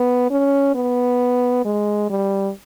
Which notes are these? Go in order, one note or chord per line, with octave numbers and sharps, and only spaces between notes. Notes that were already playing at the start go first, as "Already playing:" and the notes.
Already playing: B3
C#4
B3
G#3
G3